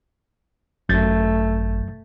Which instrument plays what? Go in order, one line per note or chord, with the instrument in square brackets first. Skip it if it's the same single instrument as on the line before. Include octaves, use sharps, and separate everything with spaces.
[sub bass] G#1 [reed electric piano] F#2 G6 A6 [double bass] A3